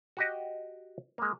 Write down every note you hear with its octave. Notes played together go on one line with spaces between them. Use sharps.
F#4 G4 D#5
G#3 A#3